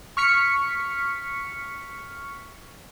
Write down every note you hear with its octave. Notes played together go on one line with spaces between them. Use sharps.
C#6 F6 B6 C#7